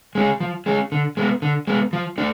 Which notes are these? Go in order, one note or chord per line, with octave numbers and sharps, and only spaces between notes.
G#3 C#4 G#4
F3
G#3 C#4 G#4
D3
G#3 B3
D3
G#3 B3
F3
A3 D4